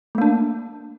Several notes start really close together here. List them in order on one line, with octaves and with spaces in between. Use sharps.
A3 A#3 D4